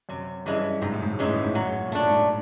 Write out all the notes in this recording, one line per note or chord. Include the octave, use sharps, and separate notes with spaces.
F#2 C3
G2 E3 G#3 C#4 E4
G#2 C3
A2
G#2
A2
G#2 E3 G#3 C#4 E4
A2
G#2
F#2 F#3
A#2
A2 A3 D4
G#2